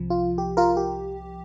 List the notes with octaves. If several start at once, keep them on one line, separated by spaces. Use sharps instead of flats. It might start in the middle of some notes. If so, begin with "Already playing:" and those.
Already playing: C2 C3 F3
F4
G4
F4 A#4
G4